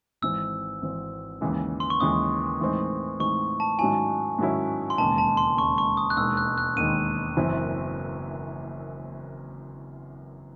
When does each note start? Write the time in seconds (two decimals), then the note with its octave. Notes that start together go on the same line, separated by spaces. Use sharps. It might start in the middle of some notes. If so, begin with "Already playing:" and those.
0.22 G#1 G#2 E3 C4 E6
0.82 G#1 G#2 E3 C4
1.41 D#2 C#3 E3 G#3
1.80 C6
1.90 C#6
2.00 D#2 C#3 E3 G#3 D#6
2.60 A2 E3 G#3 C4 D#4
3.20 A2 E3 G#3 C4 D#4 C#6
3.60 A5
3.79 G#2 D#3 F#3 C#4 E4 G#5
4.39 G#2 D#3 F#3 C#4 E4
4.90 C6
4.98 E1 D#2 C#3 G#3 A5
5.18 A5
5.37 C6
5.57 E1 D#2 C#3 G#3 C#6
5.78 C#6
5.97 D#6
6.10 F#6
6.17 E1 D#2 D#3 G#3 E6
6.37 F#6
6.58 F#6
6.76 E1 D#2 D#3 G#3 D#7
7.37 F#1 F#2 E3 C4 E4